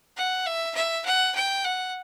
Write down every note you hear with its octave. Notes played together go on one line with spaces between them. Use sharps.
F#5
E5
E5
F#5
G5
F#5